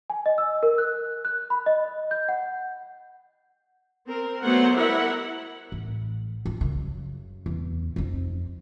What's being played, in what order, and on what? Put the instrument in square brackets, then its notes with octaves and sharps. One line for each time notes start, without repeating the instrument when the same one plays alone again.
[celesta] G#5
D#5
E6
A#4
F#6
F#6
B5
D#5
G6
F#5
[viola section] C4 A#4
F#3 A3 B3 C5 F#5
G3 E4 A#4 E5 F#5
[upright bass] A1
F3
F#2 C#3
E2
F2 D#4